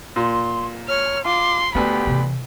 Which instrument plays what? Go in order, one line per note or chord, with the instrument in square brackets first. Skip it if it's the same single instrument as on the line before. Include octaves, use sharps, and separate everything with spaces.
[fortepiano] A#2 [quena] C6
[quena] C#5 [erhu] F6
[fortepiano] F4 [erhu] C6 [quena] D6
[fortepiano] D2 B3 [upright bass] A3 [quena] G4 [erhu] B5
[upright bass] C3 E3